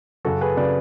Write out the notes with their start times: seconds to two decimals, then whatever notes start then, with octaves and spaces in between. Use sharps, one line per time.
0.25 F#2 C#3 F#3 F#4 A4
0.41 G#4 B4
0.57 C#3 F#3 B4 D5